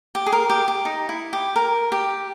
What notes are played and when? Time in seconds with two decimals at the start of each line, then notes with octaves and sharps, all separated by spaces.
0.15 G4
0.26 G#4
0.32 A#4
0.50 G4
0.68 G4
0.85 D#4
1.09 E4
1.33 G4
1.56 A#4
1.92 G4